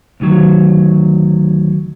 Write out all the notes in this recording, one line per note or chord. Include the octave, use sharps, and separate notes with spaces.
D2 D#3 F#3